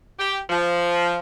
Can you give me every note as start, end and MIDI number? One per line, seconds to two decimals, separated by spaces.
0.19 0.38 67
0.50 1.19 53